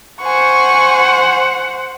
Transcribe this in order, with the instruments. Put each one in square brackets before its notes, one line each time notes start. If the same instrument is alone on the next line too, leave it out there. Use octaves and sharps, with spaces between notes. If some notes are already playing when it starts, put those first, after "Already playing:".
[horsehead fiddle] C5 F#5 [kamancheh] G#5 C#6